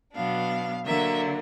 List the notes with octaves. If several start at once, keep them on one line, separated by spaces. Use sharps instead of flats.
B2 F#3 B3 D4 F5
D3 F#3 A#3 E5